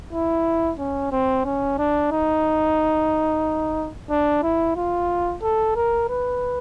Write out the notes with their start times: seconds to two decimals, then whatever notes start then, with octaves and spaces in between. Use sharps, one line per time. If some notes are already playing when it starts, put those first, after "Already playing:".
0.13 E4
0.79 C#4
1.12 C4
1.45 C#4
1.78 D4
2.12 D#4
4.10 D4
4.43 E4
4.77 F4
5.42 A4
5.76 A#4
6.09 B4